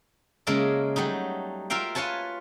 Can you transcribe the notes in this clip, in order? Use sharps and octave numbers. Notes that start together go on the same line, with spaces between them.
C#3 G#3 A#3 A#4 E5 A5
F#3 G3 A3 D#4
F4 A#4 E5 F5 G5
F4 B4 C#5 G#5 A5